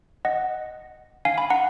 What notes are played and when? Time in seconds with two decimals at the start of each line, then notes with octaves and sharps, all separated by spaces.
0.25 D#5 F#5
1.25 F5 G#5
1.38 G#5 B5
1.50 F#5 A#5